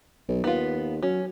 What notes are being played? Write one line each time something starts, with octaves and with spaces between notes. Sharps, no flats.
B1
D#2 B3 F4
F#3 C#4